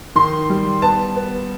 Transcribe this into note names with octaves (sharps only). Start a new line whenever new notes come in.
D#3 C6
G3
B3 A5
B3